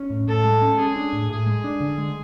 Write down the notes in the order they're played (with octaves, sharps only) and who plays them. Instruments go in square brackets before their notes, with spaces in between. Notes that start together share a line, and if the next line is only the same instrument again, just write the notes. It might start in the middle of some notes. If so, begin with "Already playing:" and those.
Already playing: [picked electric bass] C#4
A2
[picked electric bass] A2 [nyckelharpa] A4
[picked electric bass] G#3
C#4
[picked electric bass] G#3 [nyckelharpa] G#4
[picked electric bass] D4
A2
[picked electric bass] A2 [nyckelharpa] G#4
[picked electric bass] G#3
D4
D3
G#3